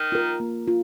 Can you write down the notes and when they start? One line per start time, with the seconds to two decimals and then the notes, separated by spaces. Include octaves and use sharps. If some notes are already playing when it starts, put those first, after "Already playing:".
Already playing: D#3
0.12 F4 A#4
0.40 A#3
0.68 F4